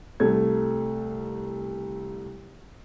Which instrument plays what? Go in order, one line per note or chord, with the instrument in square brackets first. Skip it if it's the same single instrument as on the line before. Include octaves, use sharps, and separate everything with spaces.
[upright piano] C2 A3 G#6